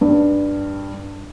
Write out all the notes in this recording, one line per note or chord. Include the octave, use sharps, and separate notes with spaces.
G2